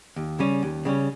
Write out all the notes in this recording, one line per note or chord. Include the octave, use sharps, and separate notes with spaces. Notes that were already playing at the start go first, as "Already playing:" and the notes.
D#2
C#3 G3 C#4
D#2
C#3 G3 C#4